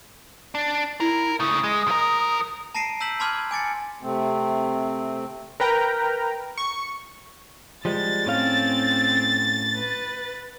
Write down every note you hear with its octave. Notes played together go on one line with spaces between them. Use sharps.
D4
E4 A#4
C#3 A3 D#6
G#3
F3 A#4
A5 A#5 A#6 C7 D7 D#7
A#5 E6 G6 B6 F#7
A5 B5 C6 D6 F6 G#6
G#5 D6 A6 C#7
C3 A3 C4
A#4 B4 G5 A#5
C#6
F3 G3 G#3 A6
A2 C4 C#4 F5
B4